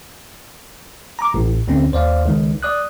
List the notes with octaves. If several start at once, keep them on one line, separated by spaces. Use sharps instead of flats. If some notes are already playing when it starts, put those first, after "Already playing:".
A#5 D6
A1 A2
D2 D3 C4 C#4
D#2 C5 D5 F5
C#2 D#3
D5 D#6 F#6